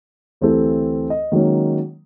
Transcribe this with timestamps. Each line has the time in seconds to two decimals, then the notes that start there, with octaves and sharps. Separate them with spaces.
0.41 D2 E3 C4 G4 A4
1.10 D#5
1.32 D#3 F#3 G#3 A#3 C#4